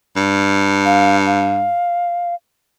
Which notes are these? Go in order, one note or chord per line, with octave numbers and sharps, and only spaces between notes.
G2
F5
F5